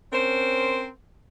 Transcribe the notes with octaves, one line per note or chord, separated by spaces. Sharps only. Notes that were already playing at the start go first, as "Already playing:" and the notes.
C4 C#4 A#4 C5